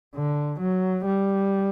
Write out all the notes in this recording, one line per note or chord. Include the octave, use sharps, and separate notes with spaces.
D3
F#3
G3